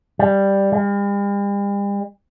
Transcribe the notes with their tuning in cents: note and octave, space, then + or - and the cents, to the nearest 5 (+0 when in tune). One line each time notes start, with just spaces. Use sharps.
G3 +5
G3 +45